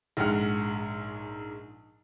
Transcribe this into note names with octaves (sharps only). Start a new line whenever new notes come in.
A#1 G#2 G#3 F#5 F6